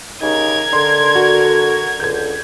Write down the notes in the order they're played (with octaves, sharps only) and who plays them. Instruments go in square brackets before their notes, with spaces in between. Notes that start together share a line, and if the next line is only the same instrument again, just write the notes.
[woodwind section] C#3 G3 D#4 [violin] A#4 G#6
[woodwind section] D3 [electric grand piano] C6
[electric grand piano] F#4
[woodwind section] C#2 D3 [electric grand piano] G6 G#6